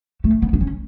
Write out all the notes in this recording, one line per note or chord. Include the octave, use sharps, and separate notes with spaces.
A3
B3
D4
C#4